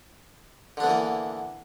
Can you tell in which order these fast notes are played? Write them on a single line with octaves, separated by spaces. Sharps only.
D3 D4 B3 E3 A#3